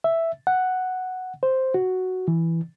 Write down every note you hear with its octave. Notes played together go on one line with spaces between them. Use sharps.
E5
F#5
C5
F#4
E3